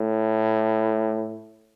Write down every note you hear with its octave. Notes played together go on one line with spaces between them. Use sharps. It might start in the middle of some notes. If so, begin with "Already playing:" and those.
Already playing: A2